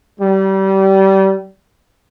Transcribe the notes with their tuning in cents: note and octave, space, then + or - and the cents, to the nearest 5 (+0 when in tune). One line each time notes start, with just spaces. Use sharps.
G3 -25